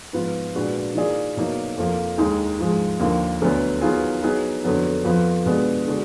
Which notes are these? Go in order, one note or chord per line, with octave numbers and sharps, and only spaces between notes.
G#2 F3 B3 F4 B4
A#2 G#3 D4 F#4 B4
D#3 A#3 F4 G#4 D5
B2 F#3 A#3 D#4
F2 F3 A#3
D#2 D#3 G#3 D#4 G#4
G#2 F3 G#3
D#2 D3 F3 A#3
D2 D3 F#3 B3
D#3 F#3 B3 F4 G#4
F#3 B3 D#4 G#4 B4
F2 D3 F#3 B3
F2 F3 B3 F4 B4
B2 G#3 B3 D4 F4
D3 G#3 D4 F#4